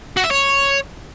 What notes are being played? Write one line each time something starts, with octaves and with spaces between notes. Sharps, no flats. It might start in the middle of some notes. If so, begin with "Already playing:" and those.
F#4
E5
C#5